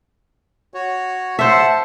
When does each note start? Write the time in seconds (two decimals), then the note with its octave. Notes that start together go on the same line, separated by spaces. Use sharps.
0.74 F#4 C#5
1.39 C5 E5 F#5 A5